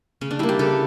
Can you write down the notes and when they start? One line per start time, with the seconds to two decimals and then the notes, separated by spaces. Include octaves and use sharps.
0.21 C#3 C#4
0.31 D4
0.39 G3 A#3 E4
0.49 G4
0.59 C#3 A4